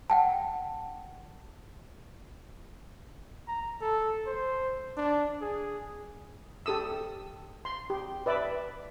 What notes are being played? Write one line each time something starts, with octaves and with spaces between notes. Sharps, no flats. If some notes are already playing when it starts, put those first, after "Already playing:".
F#5 G5 A5
A#5
A4
C5
D4
G#4
G4 A4 D#6 E6
C6
G4
B4 D5 E5 B5